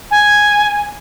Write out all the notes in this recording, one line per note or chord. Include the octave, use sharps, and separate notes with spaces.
G#5